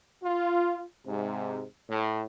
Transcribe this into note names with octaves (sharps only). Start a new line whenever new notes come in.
F4
G#2 C3
A2